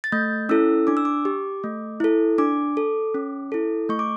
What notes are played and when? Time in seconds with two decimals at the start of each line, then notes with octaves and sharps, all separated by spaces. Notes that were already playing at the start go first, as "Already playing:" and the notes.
0.04 A6
0.12 A3 G6
0.49 C#4 E4 A4 E6
0.87 D4 D6
0.97 E6
1.05 D6
1.25 G4
1.64 A3
2.00 E4 A4
2.38 D4 D6
2.77 A4
3.15 C#4
3.52 E4 A4
3.89 A3 C#6
3.99 D6